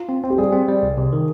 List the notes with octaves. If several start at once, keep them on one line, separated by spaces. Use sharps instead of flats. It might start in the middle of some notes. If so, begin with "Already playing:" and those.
Already playing: F4
C4
C4
G4
G3 G#4
C4
G3
C2
C3
D#3